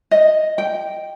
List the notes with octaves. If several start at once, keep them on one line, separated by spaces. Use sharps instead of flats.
D#5
G5